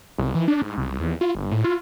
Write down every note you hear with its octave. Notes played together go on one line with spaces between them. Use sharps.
C2
E3
D4
G#2
C2
E2
F4
G1
A2
F4